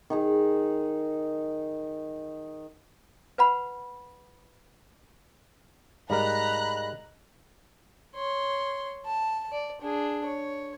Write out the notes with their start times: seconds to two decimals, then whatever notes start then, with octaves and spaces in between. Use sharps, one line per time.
0.10 D#3 D#4 G#4
3.38 B4 F#5 B5
6.10 G#2 G3 A#4 D#5 F5 A#5 B5 F#6
8.15 C#5 C6
9.05 A5
9.52 D5
9.82 D4 G#4
10.25 C#5